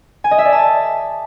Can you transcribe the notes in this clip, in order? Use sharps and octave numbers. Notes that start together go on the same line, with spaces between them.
G#5
D#5
E5
D5
A5